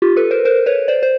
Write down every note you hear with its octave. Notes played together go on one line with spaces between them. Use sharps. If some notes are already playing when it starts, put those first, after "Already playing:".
F4 G4
A4 B4
A#4 C5
A#4 C5
B4 C#5
C5 D5
C5